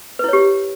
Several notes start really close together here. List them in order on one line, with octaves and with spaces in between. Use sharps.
B4 E4 C#5 G4